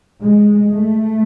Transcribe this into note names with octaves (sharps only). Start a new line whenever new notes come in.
G#3
A3